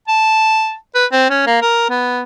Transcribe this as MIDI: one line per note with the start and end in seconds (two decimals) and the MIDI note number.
0.08 0.75 81
0.95 1.06 71
1.12 1.26 60
1.30 1.44 61
1.47 1.57 58
1.62 1.86 70
1.89 2.23 59